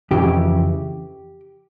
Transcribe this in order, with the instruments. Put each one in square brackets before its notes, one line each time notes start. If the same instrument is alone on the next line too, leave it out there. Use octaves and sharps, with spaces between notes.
[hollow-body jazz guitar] F2 C#3 E3 G4